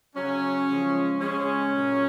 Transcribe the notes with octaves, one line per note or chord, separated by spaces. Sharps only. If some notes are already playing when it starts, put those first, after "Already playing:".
C#3 F#3 C#4
C#3 F3 G#3
C#3 G#3 C#4
A#2 F#3